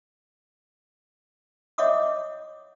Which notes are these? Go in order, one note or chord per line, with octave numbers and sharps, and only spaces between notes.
C#5 D#5 E5 F#5 D6 D#6